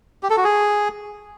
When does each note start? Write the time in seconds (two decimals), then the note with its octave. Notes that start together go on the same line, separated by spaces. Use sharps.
0.23 G4
0.30 A4
0.37 F#4
0.44 G#4